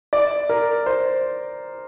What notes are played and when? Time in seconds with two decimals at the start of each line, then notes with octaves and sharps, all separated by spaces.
0.13 D5
0.49 A#4
0.86 C5